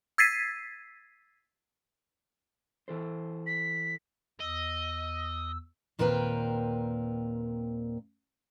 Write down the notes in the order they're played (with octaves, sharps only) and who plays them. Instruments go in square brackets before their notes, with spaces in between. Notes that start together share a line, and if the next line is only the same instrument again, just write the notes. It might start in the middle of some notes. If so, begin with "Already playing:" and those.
[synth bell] E6 G#6 A6 B6 C7 D#7
[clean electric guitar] E3 A4 C5
[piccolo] B6
[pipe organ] E2 E6 [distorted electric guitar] D#5
[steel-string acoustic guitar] D#2 A#2 C4 A#4 B4 G5